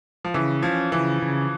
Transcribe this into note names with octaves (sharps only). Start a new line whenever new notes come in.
F3
C#3 E3
F3 C#4
C#3 E3
C#3